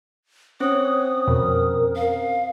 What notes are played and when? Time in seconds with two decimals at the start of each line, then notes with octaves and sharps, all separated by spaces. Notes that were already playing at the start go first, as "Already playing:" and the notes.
0.60 C4 C#4 C5 C#5 D#6
1.28 F2 B2 A#4
1.96 F5